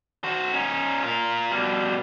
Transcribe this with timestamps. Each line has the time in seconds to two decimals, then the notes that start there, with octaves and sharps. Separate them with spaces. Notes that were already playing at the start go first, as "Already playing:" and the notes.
0.24 F#4 C5
0.53 C#4 D#4
1.03 F4 A#4
1.52 B2 G3